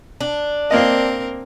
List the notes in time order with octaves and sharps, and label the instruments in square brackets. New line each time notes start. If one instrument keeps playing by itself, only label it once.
[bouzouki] D4
[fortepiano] A#3 D#5 [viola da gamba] C4 A#4